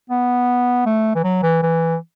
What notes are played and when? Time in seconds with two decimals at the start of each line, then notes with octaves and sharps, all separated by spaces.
0.10 B3
0.86 A3
1.15 E3
1.24 F#3
1.43 E3
1.63 E3